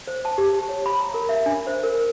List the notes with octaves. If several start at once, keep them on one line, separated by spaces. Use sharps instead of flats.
C5
A5
G4
A5
C#5
B5
A#5
A#4
E5
D4
C5
A#4